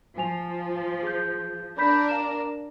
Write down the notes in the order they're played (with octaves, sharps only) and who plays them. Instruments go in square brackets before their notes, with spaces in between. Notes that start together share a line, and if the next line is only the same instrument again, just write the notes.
[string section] F3 [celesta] G#5 F7
[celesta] G#4 G6
[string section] D4 A#4 D5 [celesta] B5 G6 B6
[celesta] F5 A#5 E7